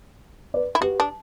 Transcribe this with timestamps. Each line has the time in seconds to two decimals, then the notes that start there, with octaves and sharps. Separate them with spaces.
0.54 B4 D5
0.75 E4
0.81 F#4 G4 B4
1.00 D4